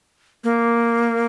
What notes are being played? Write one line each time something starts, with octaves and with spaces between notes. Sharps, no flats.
A#3